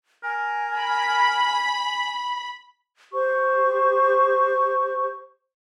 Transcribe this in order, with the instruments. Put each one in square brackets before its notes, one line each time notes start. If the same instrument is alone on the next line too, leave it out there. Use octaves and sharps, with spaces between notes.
[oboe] A#4 [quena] G#5
[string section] B5
[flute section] G4 C5 C#6